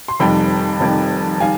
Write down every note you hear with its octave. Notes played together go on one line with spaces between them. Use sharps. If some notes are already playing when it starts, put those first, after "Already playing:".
C6
F1 F2 D#3 G3 G5 B5
F1 F2 D#3 G3
D#3 G3 F5 G#5